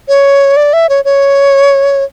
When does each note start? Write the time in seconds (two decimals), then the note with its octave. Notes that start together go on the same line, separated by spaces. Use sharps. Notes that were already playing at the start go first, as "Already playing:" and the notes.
0.08 C#5
0.57 D5
0.73 E5
0.89 C#5
1.05 C#5